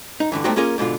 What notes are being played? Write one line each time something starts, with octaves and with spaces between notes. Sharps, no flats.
D#4
G2 D3 E3
G3 A3 B3 C4 D#4 F#4
A#3 C#4 F4 G#4 A#4
G#2 B2 D3 F4